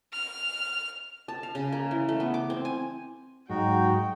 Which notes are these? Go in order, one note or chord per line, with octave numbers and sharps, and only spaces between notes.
F6
A5
F5
C#3
A#3
E3
A3
B3
D6
C4
G#5
G#2 F#3 D#4 F#4 G5